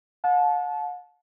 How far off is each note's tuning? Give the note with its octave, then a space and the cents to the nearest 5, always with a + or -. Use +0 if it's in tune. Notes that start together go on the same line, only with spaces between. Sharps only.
F#5 -45 A5 -25